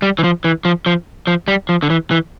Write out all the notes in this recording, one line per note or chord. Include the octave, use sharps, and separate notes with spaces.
G3
E3
F3
E3
F3
F3
F3
G3
F3
D3
E3
E3